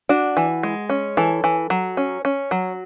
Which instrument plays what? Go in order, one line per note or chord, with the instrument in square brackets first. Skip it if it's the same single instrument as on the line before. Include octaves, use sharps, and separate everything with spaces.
[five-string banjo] D4 F#4
E3
G#3
C#4
E3 A4
E3
F#3
C#4
C#4
F#3